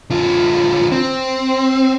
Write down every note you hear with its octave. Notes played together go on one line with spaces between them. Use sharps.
D3 F4
C4